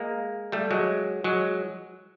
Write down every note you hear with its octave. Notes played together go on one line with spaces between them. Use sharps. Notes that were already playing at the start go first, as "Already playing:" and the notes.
Already playing: G#3 A#3
G3 A3
F#3 G#3
F#3 G#3